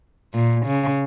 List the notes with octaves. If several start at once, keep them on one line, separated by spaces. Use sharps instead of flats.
A#2
C#3